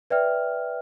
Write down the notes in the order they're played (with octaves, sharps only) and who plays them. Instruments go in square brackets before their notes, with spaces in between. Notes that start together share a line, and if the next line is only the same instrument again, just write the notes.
[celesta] B4 D5 E5 G5 F6